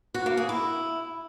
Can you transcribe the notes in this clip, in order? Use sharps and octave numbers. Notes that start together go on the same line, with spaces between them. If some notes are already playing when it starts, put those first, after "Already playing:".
F#4
A#3
G#4
E4